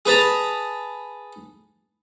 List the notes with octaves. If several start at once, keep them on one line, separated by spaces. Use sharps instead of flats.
G#4 B4 A5 A#5